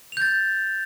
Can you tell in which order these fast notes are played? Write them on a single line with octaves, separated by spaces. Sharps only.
F7 G6 A6